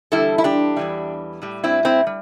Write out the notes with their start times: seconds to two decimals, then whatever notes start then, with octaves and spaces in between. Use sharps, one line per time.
0.12 E2 D3 G3 E4 A4
0.38 E4
0.44 D4 G4
0.77 E2 E3 G3
1.42 A2 G3
1.64 C4 E4
1.85 C4 E4
2.07 G3